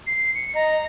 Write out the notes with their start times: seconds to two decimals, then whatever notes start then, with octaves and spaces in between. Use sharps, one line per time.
0.07 C7
0.35 C#7
0.55 D#5 A#5